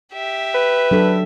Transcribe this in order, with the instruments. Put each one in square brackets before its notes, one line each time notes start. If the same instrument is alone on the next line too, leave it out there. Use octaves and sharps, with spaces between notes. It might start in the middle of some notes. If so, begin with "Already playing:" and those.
[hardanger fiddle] G4 E5
[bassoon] B4
[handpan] F#3 D4 A4